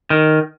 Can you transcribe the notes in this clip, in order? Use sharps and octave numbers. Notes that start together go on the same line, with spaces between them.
D#3